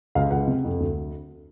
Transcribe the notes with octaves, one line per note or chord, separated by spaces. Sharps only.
C#2 F5
C#2 F#5
C3
F2
D2